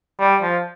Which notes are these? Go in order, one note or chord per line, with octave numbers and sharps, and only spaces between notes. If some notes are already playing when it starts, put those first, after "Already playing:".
G3
F3